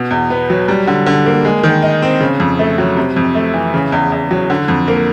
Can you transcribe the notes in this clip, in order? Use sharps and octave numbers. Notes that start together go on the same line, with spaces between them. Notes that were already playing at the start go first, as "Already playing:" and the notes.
Already playing: B2
E2
B3
F#3
G3
D3
D3
A#3
G#3
D#3
D#4
C4
C#3
F2
A3
F#3
C3
F2
A3
E3
C#3
E2
E2
F#3
D3
F2
A#3